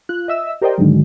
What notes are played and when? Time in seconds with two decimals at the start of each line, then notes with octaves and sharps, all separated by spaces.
0.09 F4 F#6
0.28 D#5 E5 E6
0.61 G4 A#4 C5 D5 D#5 G5
0.78 G#2 D3 D#3 F#3 G#3